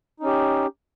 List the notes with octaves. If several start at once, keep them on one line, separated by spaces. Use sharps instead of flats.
C#4 D#4 G4